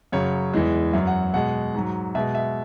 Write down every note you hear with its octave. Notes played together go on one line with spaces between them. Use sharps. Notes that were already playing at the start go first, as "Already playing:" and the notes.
F#2 C#3 F#3 C#5
E2 E3 G#3
F#2 F#3 E5
F#5
B2 G#3 F#5
G#2 F#3
B2 G#3 E5
E5